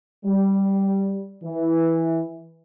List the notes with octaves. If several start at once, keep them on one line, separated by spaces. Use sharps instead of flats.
G3
E3